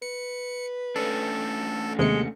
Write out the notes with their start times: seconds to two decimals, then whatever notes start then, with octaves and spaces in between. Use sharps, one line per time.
0.02 B4 C#7
0.96 A3 C#4 D4 A4
1.99 D#2 C3 G#3 C#7